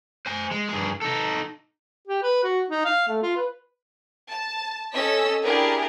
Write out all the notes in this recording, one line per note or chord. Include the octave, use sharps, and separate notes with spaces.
C5 G#5
G#3
G2 G#4
D#4 A4
G4
B4
F#4
D#4
F5
A3
F4
B4
A5
C#4 A4 D#5 E6 B6
D4 E4 G4 G#4 A#4